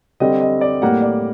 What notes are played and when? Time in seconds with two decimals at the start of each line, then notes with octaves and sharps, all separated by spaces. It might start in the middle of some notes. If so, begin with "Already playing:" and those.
0.20 D3 G3 C4 D#5
0.41 D#5
0.61 D5
0.82 A2 G3 A#3 F#5
1.02 D5